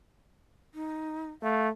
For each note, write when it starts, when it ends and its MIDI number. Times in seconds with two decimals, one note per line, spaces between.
0.74 1.30 63
1.42 1.69 57
1.42 1.66 77